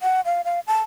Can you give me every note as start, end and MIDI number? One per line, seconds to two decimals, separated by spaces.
0.01 0.21 78
0.25 0.41 77
0.45 0.60 77
0.67 0.78 81